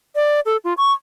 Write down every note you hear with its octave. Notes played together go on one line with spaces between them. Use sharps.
D5
A4
F4
C#6